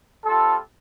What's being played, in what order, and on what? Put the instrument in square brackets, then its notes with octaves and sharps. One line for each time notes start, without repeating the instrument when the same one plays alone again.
[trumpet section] G3 C4 F4 A4